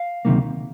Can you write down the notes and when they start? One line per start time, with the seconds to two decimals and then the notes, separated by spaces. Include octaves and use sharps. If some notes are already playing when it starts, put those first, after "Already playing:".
Already playing: F5
0.25 C#2 C3 D#3 F#3 A#3